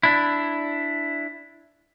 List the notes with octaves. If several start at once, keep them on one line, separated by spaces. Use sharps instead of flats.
D4 E4